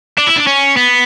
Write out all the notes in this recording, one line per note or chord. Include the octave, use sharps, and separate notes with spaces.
D4
E4
D4
C#4
B3